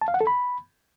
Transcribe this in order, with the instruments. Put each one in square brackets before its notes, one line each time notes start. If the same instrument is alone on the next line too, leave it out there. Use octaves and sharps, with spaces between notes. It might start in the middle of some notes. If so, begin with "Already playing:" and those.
[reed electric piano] A5
F5
F#5
A4
B5